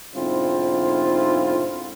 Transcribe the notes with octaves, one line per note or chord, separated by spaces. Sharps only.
B1 G#2 D3 C4 E4 F4